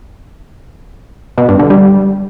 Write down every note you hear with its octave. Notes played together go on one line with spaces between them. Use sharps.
B2
G2
D3
G3